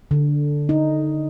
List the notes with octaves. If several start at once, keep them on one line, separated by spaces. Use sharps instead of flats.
D3
D#4